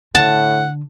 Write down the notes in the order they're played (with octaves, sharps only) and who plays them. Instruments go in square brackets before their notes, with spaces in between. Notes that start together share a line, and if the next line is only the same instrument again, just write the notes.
[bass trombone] A2 [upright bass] D3 [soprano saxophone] F#5 [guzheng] A5